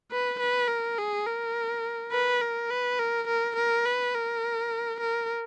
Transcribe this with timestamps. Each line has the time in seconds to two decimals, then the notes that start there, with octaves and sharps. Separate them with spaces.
0.11 B4
0.40 B4
0.68 A#4
0.98 G#4
1.26 A#4
2.12 B4
2.41 A#4
2.70 B4
2.99 A#4
3.28 A#4
3.56 A#4
3.85 B4
4.15 A#4
5.00 A#4